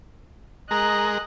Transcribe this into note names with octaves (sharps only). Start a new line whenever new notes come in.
G#3 G#4 A#4 D#5 A#5 F#6